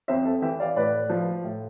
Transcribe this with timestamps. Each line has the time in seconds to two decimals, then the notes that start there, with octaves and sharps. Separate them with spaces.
0.08 F2 C5 E5
0.25 A4
0.42 E3 E5 G5
0.60 D5 F5
0.76 A2 B4 D5
1.10 F3
1.44 A2